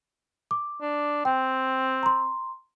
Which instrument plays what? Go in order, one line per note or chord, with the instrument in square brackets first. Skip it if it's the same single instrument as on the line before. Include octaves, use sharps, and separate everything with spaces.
[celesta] D6
[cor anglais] D4
[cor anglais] C4 [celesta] G5
[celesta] A#5 C6